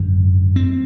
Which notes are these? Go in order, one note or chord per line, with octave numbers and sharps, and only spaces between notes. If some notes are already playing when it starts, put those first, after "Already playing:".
Already playing: G#1 F#2 D3
C4